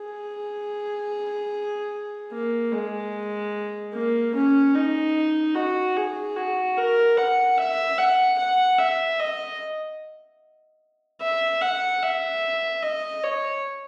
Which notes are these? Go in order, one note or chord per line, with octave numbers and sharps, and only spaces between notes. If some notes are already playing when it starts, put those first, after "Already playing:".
Already playing: G#4
A#3
G#3
A#3
C#4
D#4
F#4
G#4
F#4
A#4
F#5
E5
F#5
F#5
E5
D#5
E5
F#5
E5
D#5
C#5